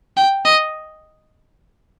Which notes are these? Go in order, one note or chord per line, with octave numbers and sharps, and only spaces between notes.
G5
D#5